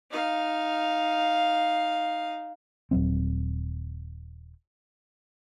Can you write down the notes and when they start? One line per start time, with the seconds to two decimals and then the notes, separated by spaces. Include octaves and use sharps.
0.11 D#4 F5
2.91 D#1 F#3 C4